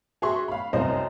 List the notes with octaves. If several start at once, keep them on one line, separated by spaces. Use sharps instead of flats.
F#4 G#4 E5 C6 C#6
F5 B5
C2 F#2 C5 D#5